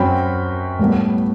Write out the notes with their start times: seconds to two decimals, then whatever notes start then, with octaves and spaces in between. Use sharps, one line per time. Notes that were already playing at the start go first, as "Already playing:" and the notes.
Already playing: F#2 F#3 C4 G5 B5
0.79 A2 G3 B3